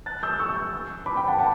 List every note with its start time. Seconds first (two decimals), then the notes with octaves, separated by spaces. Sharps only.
0.06 F#6 A6
0.23 E6 G6
0.39 C#6 E6
1.06 B5 D6
1.16 G5 B5
1.28 F#5 A5
1.39 F#5 A5